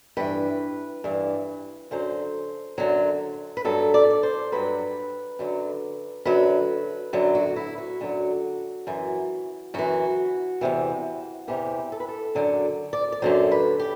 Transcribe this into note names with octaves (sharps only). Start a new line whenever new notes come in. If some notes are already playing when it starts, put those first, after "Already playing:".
G2 E3 B4
G2 E3
F#2 D3 F#3 C5
F#2 D3 F#3
B4
G2 F#3 A4
D5
D5
C5
G2 F#3 B4
F#2 D3 F#3
F#2 D3 F#3 B4
F#2 D3 F#3
F#4
E4
F#4
F#2 D3 F#3
F#2 E3
F#2 E3 F#4
E2 C3 E3
E2 C3 E3 G4
A4
B4
A4
F#2 D3 F#3
D5
D5
F#2 D3 F#3 C5
B4
G4